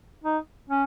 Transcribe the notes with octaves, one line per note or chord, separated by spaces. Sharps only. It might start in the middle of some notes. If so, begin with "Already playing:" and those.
D#4
C#4